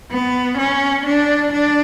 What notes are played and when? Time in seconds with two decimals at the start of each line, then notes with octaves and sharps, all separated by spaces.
0.11 B3
0.58 C#4
1.05 D4
1.53 D4